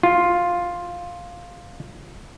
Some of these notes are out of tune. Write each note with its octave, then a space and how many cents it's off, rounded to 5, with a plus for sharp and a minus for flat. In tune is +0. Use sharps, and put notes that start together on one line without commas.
F4 +5